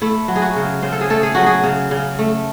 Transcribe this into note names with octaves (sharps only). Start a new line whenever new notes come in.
A3 E4
F#3
G#4
F#4
C#3
C#3 C5
A4
G#4
A3 A4
G#4
F#3 F#4
G#4
C#3
C#3
A3